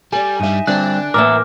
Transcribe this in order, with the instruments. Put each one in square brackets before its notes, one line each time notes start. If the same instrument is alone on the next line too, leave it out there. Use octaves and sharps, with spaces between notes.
[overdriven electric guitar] G3 [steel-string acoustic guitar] A4 D5 [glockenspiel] G#5
[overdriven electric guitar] G2 G3 [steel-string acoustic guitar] D#4 E5
[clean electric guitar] G2 C4 [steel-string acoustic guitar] D3 [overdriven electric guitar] D4 [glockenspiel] F#6
[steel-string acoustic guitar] A2 E3 A#3 [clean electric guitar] A#4 E5 [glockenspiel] D6 F6